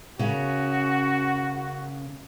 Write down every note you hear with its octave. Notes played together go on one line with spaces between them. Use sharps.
C#3 C#4 F#4 A#4